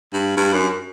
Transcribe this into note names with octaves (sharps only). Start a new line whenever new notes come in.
G2
G2
F#2